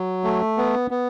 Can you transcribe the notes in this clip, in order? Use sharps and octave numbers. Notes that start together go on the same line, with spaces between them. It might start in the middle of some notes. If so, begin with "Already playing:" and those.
Already playing: F#3
A3
B3
B3